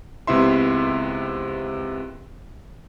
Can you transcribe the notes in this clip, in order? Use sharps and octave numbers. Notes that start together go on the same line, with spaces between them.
C#2 C3 B3 E4 E5 C6